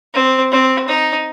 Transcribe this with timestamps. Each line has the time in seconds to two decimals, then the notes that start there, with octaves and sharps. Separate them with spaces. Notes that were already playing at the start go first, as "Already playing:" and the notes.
0.14 C4
0.52 C4
0.88 D#4